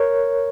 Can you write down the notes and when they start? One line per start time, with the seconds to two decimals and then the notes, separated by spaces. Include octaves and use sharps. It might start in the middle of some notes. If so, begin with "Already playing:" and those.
Already playing: A#4 C#5